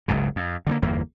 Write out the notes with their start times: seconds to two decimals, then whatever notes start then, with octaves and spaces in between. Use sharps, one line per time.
0.08 F#1 C#2 G#2 C#3
0.36 F2
0.67 D3 G3 A#3
0.82 G1 E2 A#3